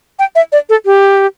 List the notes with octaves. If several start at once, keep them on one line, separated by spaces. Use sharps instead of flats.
G5
E5
D5
A4
G4